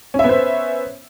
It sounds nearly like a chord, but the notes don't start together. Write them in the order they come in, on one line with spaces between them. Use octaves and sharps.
C#4 E5 B3 C5